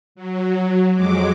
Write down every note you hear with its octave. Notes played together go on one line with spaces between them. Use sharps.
F#3
F2 F#3 G#3 D6